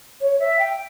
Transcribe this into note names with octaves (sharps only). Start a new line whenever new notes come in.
C#5
E5
G5